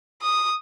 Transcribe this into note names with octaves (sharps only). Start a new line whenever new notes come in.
D#6